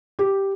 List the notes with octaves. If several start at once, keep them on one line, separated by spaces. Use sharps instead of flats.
G4